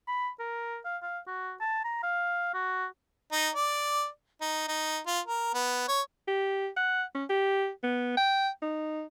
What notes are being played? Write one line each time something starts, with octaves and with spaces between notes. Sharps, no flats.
B5
A#4
F5
F5
F#4
A5
A#5
F5
F#4
D#4
D5
D#4
D#4
F4
A#4
B3
C#5
G4
F#5
C#4
G4
B3
G5
D#4